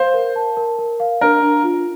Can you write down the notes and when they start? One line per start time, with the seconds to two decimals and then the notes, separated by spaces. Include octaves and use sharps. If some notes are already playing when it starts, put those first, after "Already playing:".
Already playing: C5 F5
0.14 A#4
0.36 A5
0.57 A#4
0.79 A#4
1.00 F5
1.21 D4 A#4
1.42 D4
1.63 F4